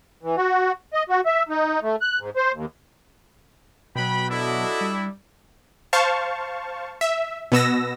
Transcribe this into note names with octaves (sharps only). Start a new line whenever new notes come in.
E3
F#4
D#5
F#4
E5
D#4
A3
F#6
G#2
C5
D#2
B2 F#3 B4 G5 B5
D4 E4 F#4 A4 D#5
G3
C5 F5 A5 C#6
E5
B2 B3 E6 A#6